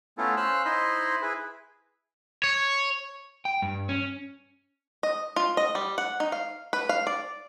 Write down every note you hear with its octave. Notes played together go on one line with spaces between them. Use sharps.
A3 B3 C#4 E4 F4 A4
C#4 C5 F5 C6 E6 F#6
D#4 E4 C5 D#5 B5 C6
E4 G#4 B4
C#5
G5
G2
C#4
D#5
F4
D#5
G3
F#5
D#4
F5
B4
F5
D5